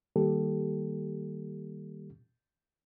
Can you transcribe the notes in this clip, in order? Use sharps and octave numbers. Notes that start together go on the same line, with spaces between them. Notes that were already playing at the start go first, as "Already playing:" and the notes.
D#3 G3 A#3 G4 A4